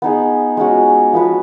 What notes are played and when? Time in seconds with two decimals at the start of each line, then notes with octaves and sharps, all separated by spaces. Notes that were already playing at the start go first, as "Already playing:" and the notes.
0.02 B3 D#4 G#4
0.57 G#3 C#4 F#4
1.13 F3 B3 F#4 B4